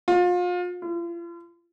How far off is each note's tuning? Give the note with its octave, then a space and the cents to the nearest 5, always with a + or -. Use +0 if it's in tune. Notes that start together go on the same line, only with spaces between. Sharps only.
F4 +35
F4 -40